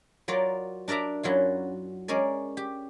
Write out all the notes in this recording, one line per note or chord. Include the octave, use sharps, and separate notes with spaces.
F#3 F4 A#4 D5
D4 A#4 D5 E5 A#5
F#2 F#3 E4 F4
G#3 C#4 A#4 D5
G4